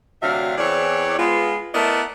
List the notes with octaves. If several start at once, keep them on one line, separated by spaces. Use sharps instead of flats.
D2 C3 F#3 D4 E5 F5
E2 E3 C4 C#5 D5
G#3 B3 F4
A3 B3 E4 A#4 D5 D#5